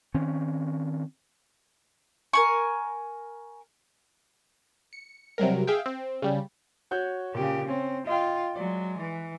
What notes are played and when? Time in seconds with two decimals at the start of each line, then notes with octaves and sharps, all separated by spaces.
0.14 D#3 C4 C#4
2.33 A#4 G#5 C#6
4.93 C#7
5.38 C3 F#3 G3 A#4
5.67 G#4 E5 F5 G5
5.86 C4
6.22 C#3 G3
6.91 F#4 C#5 G6
7.35 A#2 C#3 G4
7.69 C4 C#4
8.07 F4 D#5 F5 G5
8.56 F#3 G#3 D5
8.98 E3